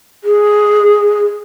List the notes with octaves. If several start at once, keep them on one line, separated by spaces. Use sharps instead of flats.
G#4